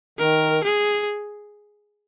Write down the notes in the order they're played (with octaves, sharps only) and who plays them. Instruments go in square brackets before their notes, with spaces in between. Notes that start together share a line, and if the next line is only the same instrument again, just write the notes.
[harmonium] D#3 [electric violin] A#4
[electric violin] G#4